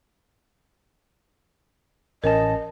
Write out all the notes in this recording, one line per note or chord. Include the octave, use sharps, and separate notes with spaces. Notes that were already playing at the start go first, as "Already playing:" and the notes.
A1 C#4 A#4 D#5 A5